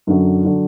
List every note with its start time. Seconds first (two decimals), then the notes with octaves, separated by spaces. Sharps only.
0.07 F#2 D3 F#3
0.45 D3 F#3